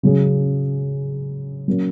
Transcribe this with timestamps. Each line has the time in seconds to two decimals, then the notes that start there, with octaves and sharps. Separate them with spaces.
0.03 C#3 F#3 C#4 G#4
1.68 F#3 A#3 C#4